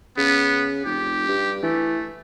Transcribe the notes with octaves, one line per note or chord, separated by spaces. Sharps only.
C#3 B3
F1 G4
G2
E3 A3